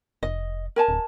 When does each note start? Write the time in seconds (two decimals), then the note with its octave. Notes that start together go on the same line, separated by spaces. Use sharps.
0.23 F1 D#5
0.76 A#4 G#5 A5
0.88 D1